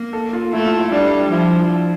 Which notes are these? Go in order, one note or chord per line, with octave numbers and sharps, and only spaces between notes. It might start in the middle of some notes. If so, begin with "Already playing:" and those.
Already playing: A#3
A4
F4
A3 E4
F4
E4
G3 D4
F3 E4